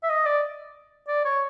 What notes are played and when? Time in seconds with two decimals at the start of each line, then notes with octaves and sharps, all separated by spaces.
0.03 E5
0.10 D#5
0.26 D5
1.08 D5
1.25 C#5